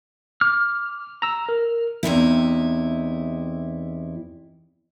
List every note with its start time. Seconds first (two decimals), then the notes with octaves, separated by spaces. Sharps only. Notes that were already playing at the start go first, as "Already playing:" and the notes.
0.41 D6 F6
1.22 A#5 E6
1.49 A#4
2.03 E2 C3 D#4 E4